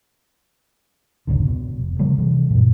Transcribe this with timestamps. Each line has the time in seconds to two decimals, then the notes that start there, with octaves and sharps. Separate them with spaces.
1.27 F1 C#2 G#2 D3
1.47 B2
1.79 F1
1.99 C#3 F3 G3 A#3
2.18 C3 E3
2.51 F#2 A#2